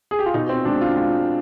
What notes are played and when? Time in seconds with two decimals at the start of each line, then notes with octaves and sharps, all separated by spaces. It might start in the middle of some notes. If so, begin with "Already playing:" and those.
0.11 G#4
0.19 G4
0.26 F4
0.34 B2 D#4
0.49 C4
0.65 G#3 D4
0.81 F4
0.96 G#3 F4